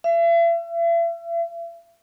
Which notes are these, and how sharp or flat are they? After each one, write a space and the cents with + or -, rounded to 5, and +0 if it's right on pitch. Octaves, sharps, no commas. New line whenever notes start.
E5 +40